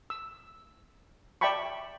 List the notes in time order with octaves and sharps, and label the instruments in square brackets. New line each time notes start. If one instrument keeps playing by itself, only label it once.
[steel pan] E6
D5 E5 G5 A5 B5 C#6